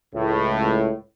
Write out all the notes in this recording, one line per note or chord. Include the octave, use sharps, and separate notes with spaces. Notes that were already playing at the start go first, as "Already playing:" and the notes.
C#2 A2